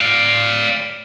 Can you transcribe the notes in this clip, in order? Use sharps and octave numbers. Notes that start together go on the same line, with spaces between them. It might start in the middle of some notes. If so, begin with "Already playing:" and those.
D5 F5